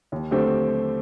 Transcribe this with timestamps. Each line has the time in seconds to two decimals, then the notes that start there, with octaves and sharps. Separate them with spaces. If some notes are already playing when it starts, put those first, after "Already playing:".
0.12 D#2
0.31 D3 A3 C4 G4